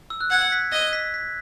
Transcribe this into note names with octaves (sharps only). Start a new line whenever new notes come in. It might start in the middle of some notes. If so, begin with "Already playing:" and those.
E6
F#6
F#5 G#6
B6
D#5 A#6
B6
B6